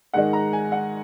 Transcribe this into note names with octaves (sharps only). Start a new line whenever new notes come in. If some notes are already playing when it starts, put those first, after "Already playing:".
G#2 D#3 G#3 D#4 F#5
A#5
G#5
F#5